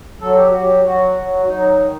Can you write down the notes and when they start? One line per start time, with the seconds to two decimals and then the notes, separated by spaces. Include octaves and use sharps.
0.21 F#3 A4
0.35 G4
0.49 F#3 F#4
0.61 G4
0.84 F#3 F#4
1.17 F#3
1.48 F#3 D#4
1.80 D#3